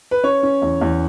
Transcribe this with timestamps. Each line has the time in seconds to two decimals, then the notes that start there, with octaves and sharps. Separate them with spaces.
0.11 B4
0.24 C#4 C#5
0.43 C#4
0.62 E2
0.81 E2